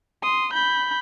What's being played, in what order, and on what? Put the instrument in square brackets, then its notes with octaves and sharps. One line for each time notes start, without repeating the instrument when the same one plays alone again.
[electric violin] C6 D#6
B5 G6